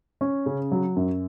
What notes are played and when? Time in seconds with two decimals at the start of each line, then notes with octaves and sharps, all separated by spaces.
0.21 C#4
0.46 C#3
0.72 F#3
0.96 F#2